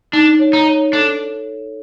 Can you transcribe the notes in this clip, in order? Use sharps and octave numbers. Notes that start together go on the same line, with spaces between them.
D4 D#4
C#5
D#4
C#5
D4 A4